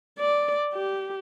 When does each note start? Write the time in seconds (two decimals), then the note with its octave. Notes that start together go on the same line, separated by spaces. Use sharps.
0.19 D5
0.73 G4